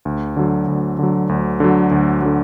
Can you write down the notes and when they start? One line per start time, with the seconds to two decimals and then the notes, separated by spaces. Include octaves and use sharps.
0.05 D2
0.37 D3 F#3
0.68 D2
0.99 D3 F#3
1.29 D2
1.60 D3 F#3
1.91 D2
2.22 D3 F#3